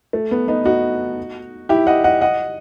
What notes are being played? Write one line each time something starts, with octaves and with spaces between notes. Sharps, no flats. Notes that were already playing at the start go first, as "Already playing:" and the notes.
A3
B3
B3 D#4
D#4 F#4
E4 G4
D#5 F#5
D#5 F#5
D#5 F#5